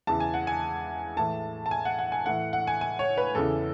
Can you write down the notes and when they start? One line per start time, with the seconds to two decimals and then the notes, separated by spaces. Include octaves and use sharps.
0.07 E2 C#3 E3 A5
0.20 G#5
0.34 F#5
0.47 G#5
1.17 A2 E3 A5
1.66 A5
1.71 G#5
1.85 F#5
1.99 F#5
2.12 G#5
2.26 A2 E3 F#5
2.53 F#5
2.67 G#5
2.81 G#5
2.99 C#5
3.18 B4
3.35 E2 C#3 E3 A4